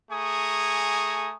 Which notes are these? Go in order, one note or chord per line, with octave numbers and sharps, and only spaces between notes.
A3 G#4 G#5 A#5 C#6 D#6